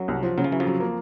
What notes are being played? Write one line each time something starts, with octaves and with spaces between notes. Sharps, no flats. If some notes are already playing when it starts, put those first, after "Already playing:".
Already playing: F#2 F#3
C2
F3
C#3 F#3
F3
E3 F#3
F2 F3
F#3
A#3